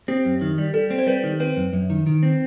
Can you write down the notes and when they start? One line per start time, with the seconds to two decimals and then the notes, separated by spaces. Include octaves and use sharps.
0.08 C4 G4
0.25 F#2
0.41 D#3
0.58 G3
0.74 G3 A4
0.91 C4
0.99 C5
1.07 G3 B4
1.23 D#3
1.40 C4 B4
1.57 F#2
1.73 F#2
1.90 D#3
2.07 D#3
2.23 C4